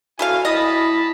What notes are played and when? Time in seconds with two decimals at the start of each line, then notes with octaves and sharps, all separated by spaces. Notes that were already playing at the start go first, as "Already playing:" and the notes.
0.19 E4 F#4 A4 F5 G#5
0.45 E4 D#5 A5 B5